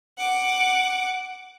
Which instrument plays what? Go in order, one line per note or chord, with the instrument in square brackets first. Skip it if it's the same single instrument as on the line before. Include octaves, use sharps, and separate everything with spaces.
[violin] F#5 D6